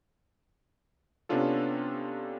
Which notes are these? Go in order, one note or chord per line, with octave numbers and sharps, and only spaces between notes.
C3 B3 C#4 D4 F4 A4